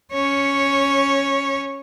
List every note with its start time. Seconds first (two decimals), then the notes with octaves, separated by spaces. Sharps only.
0.12 C#4 C#5